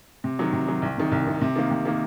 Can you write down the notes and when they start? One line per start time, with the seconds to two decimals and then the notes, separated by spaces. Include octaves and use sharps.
0.24 C3
0.39 D#3 F#3
0.53 C3
0.68 D#3 F#3
0.82 C2
0.97 C3 D#3
1.12 C2
1.27 C3 D#3
1.41 C3
1.56 D#3 A#3
1.71 C3
1.85 D#3 A#3